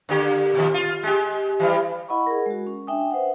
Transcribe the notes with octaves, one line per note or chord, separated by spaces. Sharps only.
D3 A#3 G4
A#2 D#3 F3
F4
G#3 G4
E3 G3
E4 D#5 F#5 B5 C#6
G#4 A#4
G#3 F#4
C#4
D4 E5 G5 G#5 D#6
B4 C5 E5 F#5